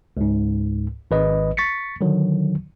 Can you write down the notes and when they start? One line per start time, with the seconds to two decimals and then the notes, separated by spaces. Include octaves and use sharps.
0.17 C#2 G#2
1.11 G#1 B4 D#5
1.57 C#6 A6 B6 C#7
2.01 D3 D#3 F#3